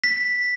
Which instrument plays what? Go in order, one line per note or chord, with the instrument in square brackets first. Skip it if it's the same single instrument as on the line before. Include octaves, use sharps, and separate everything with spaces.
[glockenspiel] B6